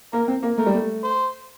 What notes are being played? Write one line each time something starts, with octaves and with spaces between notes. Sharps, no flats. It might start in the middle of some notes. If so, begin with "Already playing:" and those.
A#3 A#4
C4
A#3
A3 A#4
G3
A3
C5